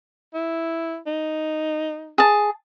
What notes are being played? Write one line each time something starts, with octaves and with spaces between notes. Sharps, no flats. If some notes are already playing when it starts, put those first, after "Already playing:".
E4
D#4
G#4 A5